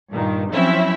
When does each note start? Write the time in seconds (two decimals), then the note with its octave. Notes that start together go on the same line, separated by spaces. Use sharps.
0.10 G2 A#2 D#3
0.51 F3 F#3 C4 C#4 E4 E5